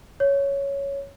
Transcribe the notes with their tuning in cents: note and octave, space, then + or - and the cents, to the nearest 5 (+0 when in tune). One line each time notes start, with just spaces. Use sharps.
C#5 +5